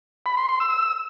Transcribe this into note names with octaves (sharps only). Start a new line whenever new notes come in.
B5
C6
C6
E6